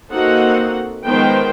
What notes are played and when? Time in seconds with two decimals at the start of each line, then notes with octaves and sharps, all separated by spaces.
0.12 A#3 C4 D#4 F#4 A4 F#5
1.06 D#3 F3 G#3 B3 C5 G5